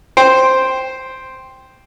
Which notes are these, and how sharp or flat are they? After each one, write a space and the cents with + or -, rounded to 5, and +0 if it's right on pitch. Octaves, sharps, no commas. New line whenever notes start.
C5 +0 G5 +0